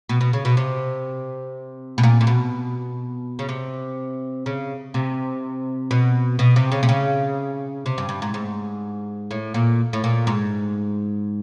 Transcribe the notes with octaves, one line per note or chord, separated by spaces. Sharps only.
B2
B2
C#3
B2
C3
B2
A#2
A#2
B2
C#3
C3
C#3
C3
B2
B2
C3
C#3
C3
C#3
C3
G2
G2
G#2
G#2
A2
A#2
A2
A#2
G#2